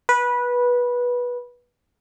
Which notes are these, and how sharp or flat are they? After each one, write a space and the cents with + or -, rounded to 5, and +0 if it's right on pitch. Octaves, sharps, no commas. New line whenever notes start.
B4 -15